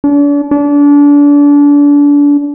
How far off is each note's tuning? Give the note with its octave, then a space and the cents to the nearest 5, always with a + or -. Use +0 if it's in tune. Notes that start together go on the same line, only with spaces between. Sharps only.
D4 -40
D4 -30